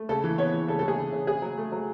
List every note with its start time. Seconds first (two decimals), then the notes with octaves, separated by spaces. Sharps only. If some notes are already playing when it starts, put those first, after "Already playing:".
Already playing: A3
0.09 C#3 A4
0.24 E3
0.38 B3 C#5
0.53 E3
0.68 C#3 A4
0.79 A4
0.83 E3 G#4
0.97 C#3
1.12 C#3
1.27 C#3 G#4
1.42 F#3
1.58 A3
1.72 F#3